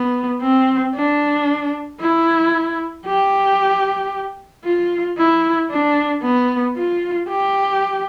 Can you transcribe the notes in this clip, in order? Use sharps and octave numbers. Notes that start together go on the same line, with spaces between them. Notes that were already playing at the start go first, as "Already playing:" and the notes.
Already playing: B3
C4
D4
E4
G4
F4
E4
D4
B3
F4
G4